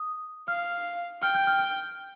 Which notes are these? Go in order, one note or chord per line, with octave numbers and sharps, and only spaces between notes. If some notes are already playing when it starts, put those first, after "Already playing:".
Already playing: D#6
F5 F6
G5 F6
G6
F6
F6